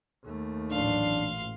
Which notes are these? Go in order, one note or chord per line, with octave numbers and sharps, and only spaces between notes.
D#2 A3
A1 A#2 F#3 D4 F5 C6